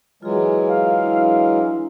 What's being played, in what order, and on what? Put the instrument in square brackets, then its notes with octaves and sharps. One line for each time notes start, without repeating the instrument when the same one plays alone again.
[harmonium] E3 F#3 G#3 [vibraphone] F4 G#4
[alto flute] F5
[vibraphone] D4 E4